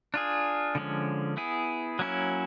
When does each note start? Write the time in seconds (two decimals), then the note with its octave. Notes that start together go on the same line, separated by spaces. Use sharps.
0.14 D4 F4 G#4
0.75 D3 F3 G#3 C#4
1.37 B3 E4 G#4
1.99 F#3 A#3 C#4 E4